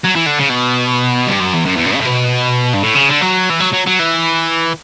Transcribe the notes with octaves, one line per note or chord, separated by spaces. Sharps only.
F#3
E3
D3
C#3
B2
G2
F#2
E2
F#2
E2
F#2
C#3
A2
B2
G2
A2
C#3
D3
F#3
E3
F#3
F#3
F#3
E3